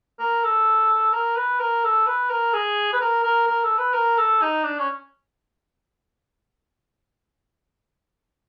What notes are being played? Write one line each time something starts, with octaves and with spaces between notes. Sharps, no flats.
A#4
A4
A#4
B4
A#4
A4
B4
A#4
G#4
B4
A#4
A#4
A#4
A4
B4
A#4
A4
D#4
D4
C#4